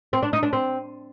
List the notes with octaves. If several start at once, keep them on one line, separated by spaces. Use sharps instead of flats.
C4
D4
D#4
D4
C4